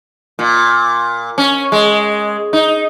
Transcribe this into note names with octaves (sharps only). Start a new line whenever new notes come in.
A#2
C#4
G#3
D#4